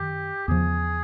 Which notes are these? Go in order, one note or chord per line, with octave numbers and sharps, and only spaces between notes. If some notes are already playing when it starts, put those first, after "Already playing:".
Already playing: F#2 D#3 G4
E2 C#3 F3 G#4